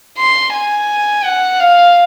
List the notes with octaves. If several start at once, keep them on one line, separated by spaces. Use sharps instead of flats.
C6
G#5
F#5
F5